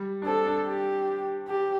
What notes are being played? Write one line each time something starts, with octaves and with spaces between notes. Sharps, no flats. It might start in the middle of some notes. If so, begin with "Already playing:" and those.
Already playing: G3
D4
C4 A4
D4
G4
G4